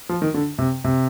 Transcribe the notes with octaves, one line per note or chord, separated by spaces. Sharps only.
F3
D#3
D3
C3
C3